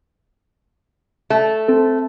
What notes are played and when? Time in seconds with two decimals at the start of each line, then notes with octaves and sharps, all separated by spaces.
1.30 A3
1.68 C4 A4